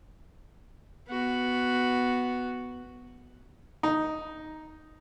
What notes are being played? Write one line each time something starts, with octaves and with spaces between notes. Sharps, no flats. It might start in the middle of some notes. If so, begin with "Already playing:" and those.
B3 F#4
D#4